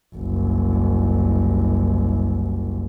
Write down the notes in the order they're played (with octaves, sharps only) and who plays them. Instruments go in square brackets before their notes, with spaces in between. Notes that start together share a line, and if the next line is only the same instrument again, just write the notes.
[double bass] F#1 C2